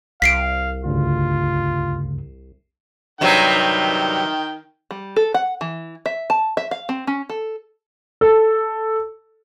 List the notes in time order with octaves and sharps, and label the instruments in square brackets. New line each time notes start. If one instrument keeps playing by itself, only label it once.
[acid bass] C2 [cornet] F5 [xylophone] B6 C7 D7
[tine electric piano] D2 G2 C#3 [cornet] F4
[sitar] G2 C3 F#3 [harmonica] D#3 G5
[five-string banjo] G3
A4
F#5
E3
E5
A5
E5
F5
C4
C#4
A4
[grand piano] A4